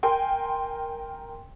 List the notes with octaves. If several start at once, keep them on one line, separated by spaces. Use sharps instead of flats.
A#4 G5 G#5 C6